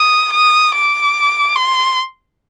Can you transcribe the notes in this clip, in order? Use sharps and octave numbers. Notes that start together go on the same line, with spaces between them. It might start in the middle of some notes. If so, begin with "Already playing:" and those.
Already playing: D#6
D#6
D6
C6